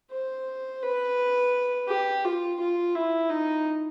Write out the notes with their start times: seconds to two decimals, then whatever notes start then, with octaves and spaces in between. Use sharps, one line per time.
0.11 C5
0.83 B4
1.88 G4
2.24 F4
2.59 F4
2.94 E4
3.30 D#4